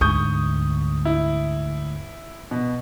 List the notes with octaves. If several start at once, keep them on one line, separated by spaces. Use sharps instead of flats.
D2 G#2 C#6 D#6 G6
E4
B2